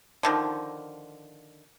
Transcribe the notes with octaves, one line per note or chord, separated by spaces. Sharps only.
D3 D#3 F3